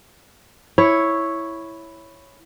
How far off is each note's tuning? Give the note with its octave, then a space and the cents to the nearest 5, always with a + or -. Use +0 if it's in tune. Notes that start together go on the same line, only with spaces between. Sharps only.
E4 +0 C#5 +0